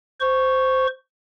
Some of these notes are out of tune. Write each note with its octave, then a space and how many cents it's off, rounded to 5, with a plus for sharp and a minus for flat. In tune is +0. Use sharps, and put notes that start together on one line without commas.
C5 -10 C#6 +0